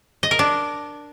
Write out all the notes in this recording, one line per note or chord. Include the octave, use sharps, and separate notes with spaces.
D#5
A#4
D4